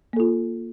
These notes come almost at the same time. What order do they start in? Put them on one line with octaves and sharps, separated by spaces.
A#3 A4 F4